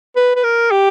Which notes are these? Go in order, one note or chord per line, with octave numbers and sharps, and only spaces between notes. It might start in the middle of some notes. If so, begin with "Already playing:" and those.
B4
B4
A#4
G4